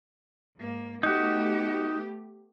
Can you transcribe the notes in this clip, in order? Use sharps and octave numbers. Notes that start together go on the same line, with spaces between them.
G#2 A#3
A3 B3 D#4 F#4 G4